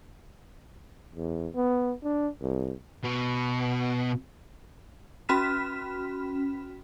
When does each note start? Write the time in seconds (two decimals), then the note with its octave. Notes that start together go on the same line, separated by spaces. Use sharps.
1.15 E2
1.55 B3
2.04 D4
2.42 C2
3.04 B2
5.29 C#4 F#4 B5 F6 B6 E7